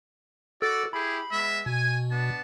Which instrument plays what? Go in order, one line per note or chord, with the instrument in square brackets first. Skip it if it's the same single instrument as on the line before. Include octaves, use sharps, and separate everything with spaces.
[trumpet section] F#4 D5 [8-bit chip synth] A4 E6
[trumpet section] E4 G4 G#4 [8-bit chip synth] B5
[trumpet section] G#3 B3 E5
[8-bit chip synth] B2 [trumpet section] G#5
[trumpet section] B3 D4 A5